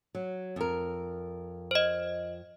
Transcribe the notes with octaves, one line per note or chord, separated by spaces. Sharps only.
F#3
F2 A#4
C5 D#5